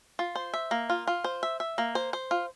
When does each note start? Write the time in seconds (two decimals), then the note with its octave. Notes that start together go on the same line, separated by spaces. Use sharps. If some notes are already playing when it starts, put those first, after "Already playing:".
0.19 F4
0.35 C5
0.54 E5
0.71 A#3
0.90 F4
1.07 F4
1.24 C5
1.43 E5
1.60 E5
1.78 A#3
1.95 C5
2.13 C5
2.31 F4